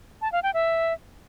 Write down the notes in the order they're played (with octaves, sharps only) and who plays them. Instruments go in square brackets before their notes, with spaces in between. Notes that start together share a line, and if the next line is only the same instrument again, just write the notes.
[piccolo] A5
F5
G5
E5